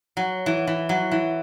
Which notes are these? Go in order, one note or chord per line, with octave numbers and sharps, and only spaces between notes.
F#3
E3
E3
F#3
E3